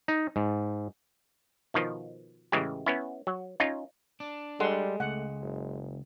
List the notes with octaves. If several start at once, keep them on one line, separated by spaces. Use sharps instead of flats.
D#4
G#2
B2 D#3 F3
A1 C#3 E3 G#3 G4
B3 C#4 E4
F#3
C#4 D#4 F4
D4
G3 G#3 A4 F#5 C6
C#2 A3 F#5
F#1